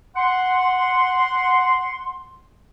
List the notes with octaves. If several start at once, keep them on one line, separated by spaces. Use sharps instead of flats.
F#5 C6